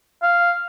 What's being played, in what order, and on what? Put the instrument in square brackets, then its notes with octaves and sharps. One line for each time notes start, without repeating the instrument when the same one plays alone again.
[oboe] F5